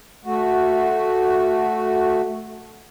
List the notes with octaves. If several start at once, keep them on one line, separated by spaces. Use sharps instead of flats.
A3 F#4